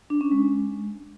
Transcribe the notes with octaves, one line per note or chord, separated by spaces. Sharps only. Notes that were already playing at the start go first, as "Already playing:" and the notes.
D4
C#4
G#3